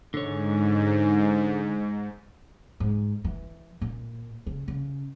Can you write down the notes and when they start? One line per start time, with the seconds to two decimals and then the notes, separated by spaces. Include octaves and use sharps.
0.14 G#2 D3 C#5
2.80 G#2
3.24 E3
3.81 A#2
4.47 C#3
4.68 C#3